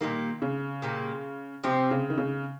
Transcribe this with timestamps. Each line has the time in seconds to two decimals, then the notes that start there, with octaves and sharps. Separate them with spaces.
0.01 A#2 D#3 G3 A#3
0.42 C#3
0.82 A#2 G3 A#3
1.64 C3 F3 C4 G4
1.91 C#3
2.10 D#3
2.18 C#3